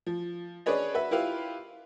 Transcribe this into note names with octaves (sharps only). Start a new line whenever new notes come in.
F3
C#4 D4 G#4 B4 C#5 D#5
F#4 B4 E5
E4 F4 G4 B4 F5